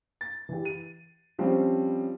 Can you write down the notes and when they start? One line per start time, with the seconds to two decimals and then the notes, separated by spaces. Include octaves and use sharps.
0.21 A6
0.49 E3 G4
0.65 D#7
1.39 F3 G3 C4 C#4